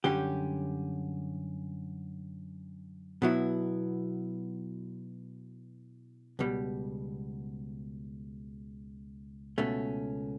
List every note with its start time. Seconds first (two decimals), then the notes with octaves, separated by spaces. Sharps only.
0.04 F#2 D3 G3 C#4 G4
3.22 B2 F#3 B3 E4
6.39 C#2 B2 G3
9.58 C#2 B2 A3 C#4